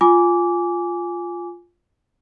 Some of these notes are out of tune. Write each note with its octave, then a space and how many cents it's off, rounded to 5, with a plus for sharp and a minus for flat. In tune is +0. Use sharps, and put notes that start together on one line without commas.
F4 +0 G#5 +0 D6 -20